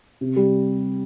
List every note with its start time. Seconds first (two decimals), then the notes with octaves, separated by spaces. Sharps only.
0.21 C3
0.36 G3